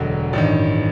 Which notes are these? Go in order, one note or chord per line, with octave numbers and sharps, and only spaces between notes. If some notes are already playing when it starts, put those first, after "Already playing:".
Already playing: E1 D2 D3 F#3 D#5
A1 G2 D#3 D5